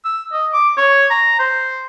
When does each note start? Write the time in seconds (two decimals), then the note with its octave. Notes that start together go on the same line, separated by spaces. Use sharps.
0.05 E6
0.33 D#5
0.53 D6
0.77 C#5
1.10 A#5
1.40 C5